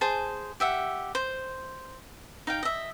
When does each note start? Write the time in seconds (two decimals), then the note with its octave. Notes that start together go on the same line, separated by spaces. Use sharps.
0.01 G#4 C5 G#5 A5
0.60 G4 E5 F#5
1.15 C5
2.47 D#4 F5 G5
2.63 D#5 E5